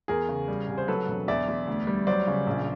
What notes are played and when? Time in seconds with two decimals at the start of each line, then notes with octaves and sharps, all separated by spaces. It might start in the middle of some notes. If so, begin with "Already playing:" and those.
0.08 E2 G#4 A#4
0.29 C#3
0.48 G3
0.68 C2
0.78 C5
0.88 F#3 A4 B4
1.08 E1
1.28 E2 D5 E5
1.48 E2
1.67 D2
1.87 G3
2.07 F#3 C5 D5
2.27 C#3
2.47 A#1